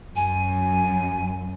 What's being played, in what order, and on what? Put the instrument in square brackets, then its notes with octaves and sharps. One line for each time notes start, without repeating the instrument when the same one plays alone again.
[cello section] F#2 [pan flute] G#5